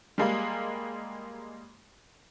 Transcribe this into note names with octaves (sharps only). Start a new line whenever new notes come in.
G3 G#3 A#3